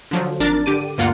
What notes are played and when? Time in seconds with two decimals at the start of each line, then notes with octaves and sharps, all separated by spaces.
0.11 D3 F3 F#3
0.40 G#1 D4 A#4 A6
0.66 D3 G4 D6 D#7
0.98 D2 G2 A#3 F4 F#5 C#7